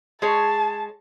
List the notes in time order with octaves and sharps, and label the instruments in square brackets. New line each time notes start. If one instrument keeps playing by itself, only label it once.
[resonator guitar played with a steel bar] G#3 G#4 C#5 [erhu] A5